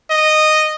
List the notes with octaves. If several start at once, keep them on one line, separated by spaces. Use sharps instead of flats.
D#5